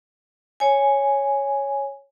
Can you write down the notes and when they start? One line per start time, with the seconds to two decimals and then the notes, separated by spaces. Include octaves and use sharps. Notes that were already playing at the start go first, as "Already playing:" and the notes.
0.60 C#5 G#5